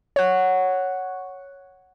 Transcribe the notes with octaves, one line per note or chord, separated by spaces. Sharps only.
C#5 F#5